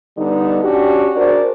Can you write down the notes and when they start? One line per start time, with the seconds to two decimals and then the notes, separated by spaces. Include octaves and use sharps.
0.17 D3 G3 B3 D#4
0.63 C#4 D4 F#4 G4
1.16 D4 F#4 G#4 A#4 C5 D5